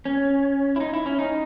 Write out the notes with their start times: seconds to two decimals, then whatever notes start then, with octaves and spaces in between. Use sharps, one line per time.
0.05 C#4
0.76 E4
0.80 D#4
0.94 E4
1.06 C#4
1.19 D#4